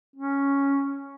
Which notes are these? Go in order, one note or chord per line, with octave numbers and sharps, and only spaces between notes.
C#4